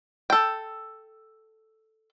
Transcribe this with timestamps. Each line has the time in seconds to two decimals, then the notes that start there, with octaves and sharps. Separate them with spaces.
0.30 A4 G5